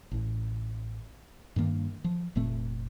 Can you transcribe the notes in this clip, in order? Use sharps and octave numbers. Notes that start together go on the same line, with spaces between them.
A1 A2
G2 D#3 A#3
F3
F1 A#2 A3 C4